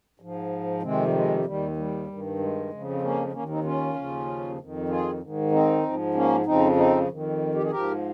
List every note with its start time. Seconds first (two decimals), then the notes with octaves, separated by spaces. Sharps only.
0.20 G#2 F3
0.82 F2 C3 D#3 G#3 C4
1.07 G3
1.14 G#3
1.45 D#2 D#3 G3
1.77 G3
2.07 G2 D#3
2.39 G#3
2.70 F2 C#3 F3
2.91 C4
3.01 A#3 C#4
3.32 D#2 D#3 A#3 C#4
3.49 C4 D#4
3.64 C#4 F4
3.95 D#2 C#3 F3
4.58 F2 D#3
4.89 F4 G#4
5.20 G#2 D#3
5.51 C4 D#4
5.82 G#2 F3
6.14 A#3 C#4
6.46 F2 C#3 F3 C4 D#4
6.76 C4 D#4
7.08 F2 D#3
7.54 G4
7.63 G#4
7.70 G#2 F3 G4 A#4